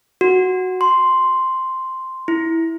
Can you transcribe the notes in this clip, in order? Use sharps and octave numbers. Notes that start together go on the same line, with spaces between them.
F#4
C6
E4